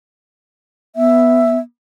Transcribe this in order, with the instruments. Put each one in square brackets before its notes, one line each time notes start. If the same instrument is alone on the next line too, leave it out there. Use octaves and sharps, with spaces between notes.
[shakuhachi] B3 [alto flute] E5